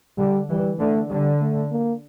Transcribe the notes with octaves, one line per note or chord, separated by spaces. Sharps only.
D3 G3
E3 G3
D3 A3
D3 G3
A3
A#3